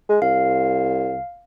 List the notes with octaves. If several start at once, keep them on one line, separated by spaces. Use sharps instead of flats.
G#3
C2 F5